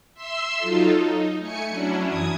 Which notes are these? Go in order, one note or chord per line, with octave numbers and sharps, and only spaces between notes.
E5 C6 E6
F#3 D#4 F4 A4
D#4
A3 G#5 C#7
F#3 C#4 D4 E4
F#2 E3 D#6 G#6